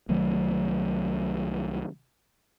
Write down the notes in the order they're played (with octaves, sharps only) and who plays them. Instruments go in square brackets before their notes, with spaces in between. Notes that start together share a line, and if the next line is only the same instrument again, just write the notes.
[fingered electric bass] C2 D#3 F#3 A3